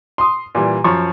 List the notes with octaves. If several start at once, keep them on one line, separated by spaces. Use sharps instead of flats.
C6 D#6
A#2 E3 G3
F#2 F3 C#6